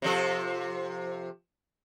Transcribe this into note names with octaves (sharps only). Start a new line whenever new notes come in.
C3 F3 A4